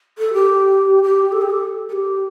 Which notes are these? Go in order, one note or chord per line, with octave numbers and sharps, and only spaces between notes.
A4
G4
G4
A4
G4
A4
A4
G4